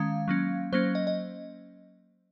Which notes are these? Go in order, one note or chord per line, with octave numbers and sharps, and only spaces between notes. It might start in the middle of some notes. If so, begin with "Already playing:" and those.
Already playing: D#3 G#3 C#4 F5
F#3 A#3 C#4
F#3 A#3 C#4 C5
D#5
D#5